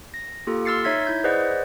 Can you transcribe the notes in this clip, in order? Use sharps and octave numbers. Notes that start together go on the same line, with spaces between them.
A#6
A#3 F4 G4 A4
C6 E6 F6 A6 C7 C#7
D#4 C#5 E5 G#6 B6
E4 G6
G#4 B4 C5 D5 D#5 F#5